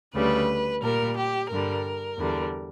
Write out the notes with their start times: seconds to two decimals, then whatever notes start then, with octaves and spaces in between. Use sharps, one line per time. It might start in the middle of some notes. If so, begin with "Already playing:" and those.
0.14 D2 C#3 G3 B4
0.82 A#2 G3 A#4
1.16 G4
1.50 G2 D3 G3 A#4
2.18 E2 D3 G3